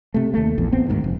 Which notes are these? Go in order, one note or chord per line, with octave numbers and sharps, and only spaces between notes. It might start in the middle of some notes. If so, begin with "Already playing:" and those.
C3 A3
D#2 A3
A#1 E2
A1 B3 C4
D2 G#2 B2 D#3
F1